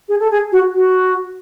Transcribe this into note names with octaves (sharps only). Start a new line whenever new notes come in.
G#4
A4
G#4
F#4
F#4